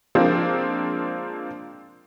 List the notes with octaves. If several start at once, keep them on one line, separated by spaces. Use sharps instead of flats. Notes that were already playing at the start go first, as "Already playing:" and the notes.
F3 G#3 A#3 C4 D4